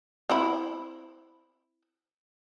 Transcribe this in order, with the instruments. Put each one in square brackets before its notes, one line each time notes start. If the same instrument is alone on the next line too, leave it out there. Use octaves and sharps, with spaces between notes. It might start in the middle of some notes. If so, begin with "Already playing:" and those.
[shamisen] C4 E4 B5